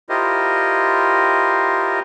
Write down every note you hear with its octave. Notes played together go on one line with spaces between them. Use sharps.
E4 F4 G4 A#4 C5 D#5